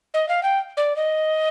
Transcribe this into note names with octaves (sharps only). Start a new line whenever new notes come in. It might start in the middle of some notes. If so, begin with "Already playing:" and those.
D#5
F5
G5
D5
D#5